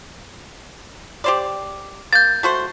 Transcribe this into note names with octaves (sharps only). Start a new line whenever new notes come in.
G4 C5 D5
A#3 G6 A6
A3 F#4 C5